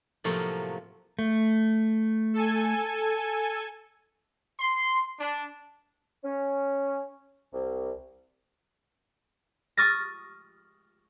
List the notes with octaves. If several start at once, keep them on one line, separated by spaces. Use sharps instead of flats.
A2 C3 F3 F#3 A3 A#3
A3
A4 G#5
C6
D4
C#4
C2
C#6 D#6 F6 A6 A#6